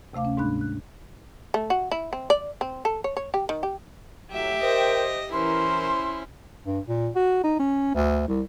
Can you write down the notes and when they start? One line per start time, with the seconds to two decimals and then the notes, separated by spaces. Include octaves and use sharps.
0.13 D2 C3 A3 F5 D6
0.25 C#4
0.37 G#2 G#3 A#3 D4 B5 F#6
0.61 F#6
1.54 A3
1.70 F#4
1.91 E4
2.13 C4
2.30 D5
2.61 C4
2.85 A4
3.04 C#5
3.17 C#5
3.34 G4
3.49 D#3
3.63 G4
4.31 A2 F#3 G4 E5
4.62 A#4 C5 D#5 G5
5.32 E3 C#4 E4 A#4 C5 C6
6.66 G2
6.88 A#2
7.15 F#4
7.43 D#4
7.59 C#4
7.94 D2
8.28 C2